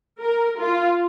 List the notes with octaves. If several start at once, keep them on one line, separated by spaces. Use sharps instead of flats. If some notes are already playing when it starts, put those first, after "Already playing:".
A#4
F4